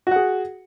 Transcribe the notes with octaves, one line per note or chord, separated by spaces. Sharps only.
F#4 G#4 F#5